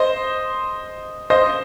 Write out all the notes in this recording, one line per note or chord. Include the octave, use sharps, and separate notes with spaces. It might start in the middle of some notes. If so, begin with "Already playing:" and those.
Already playing: C5 D#5
C5 D#5